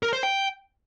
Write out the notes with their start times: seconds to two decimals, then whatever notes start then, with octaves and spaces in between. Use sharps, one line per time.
0.03 A#4
0.13 C5
0.23 G5